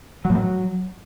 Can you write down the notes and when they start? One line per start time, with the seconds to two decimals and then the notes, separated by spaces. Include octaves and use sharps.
0.25 F#3
0.30 A2
0.35 F#3